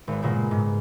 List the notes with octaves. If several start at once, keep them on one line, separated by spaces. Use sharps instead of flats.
G#1 B3
G2 A#2 C#3 G#3 A#3 B3
G#2